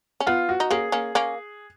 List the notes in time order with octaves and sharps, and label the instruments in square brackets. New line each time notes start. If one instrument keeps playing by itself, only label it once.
[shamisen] C#4
[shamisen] B3 [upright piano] F4
[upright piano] F#4
[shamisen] D#4
[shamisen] A#3 C#4 [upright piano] G#4
[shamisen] A#3 C#4
A#3 C#4